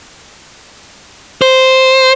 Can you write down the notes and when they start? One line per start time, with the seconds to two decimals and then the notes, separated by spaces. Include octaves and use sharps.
1.42 C5